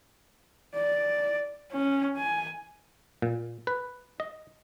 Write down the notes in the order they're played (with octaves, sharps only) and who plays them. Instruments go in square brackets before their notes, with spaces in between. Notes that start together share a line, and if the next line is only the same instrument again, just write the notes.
[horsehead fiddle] D5
C#4
G#5
[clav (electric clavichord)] A#2
B4
D#5